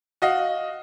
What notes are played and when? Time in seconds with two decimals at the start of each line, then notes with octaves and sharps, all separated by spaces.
0.22 F#4 D#5 F5